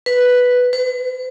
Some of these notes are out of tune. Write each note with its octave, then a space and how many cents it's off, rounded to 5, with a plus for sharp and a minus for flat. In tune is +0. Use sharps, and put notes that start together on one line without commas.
B4 +0
B4 +45